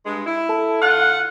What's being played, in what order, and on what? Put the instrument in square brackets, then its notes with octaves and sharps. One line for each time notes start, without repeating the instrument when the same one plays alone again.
[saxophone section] G2 G#3
E4
[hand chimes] A4 A5
[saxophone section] D3 F4 F#5 [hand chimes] F6 F#6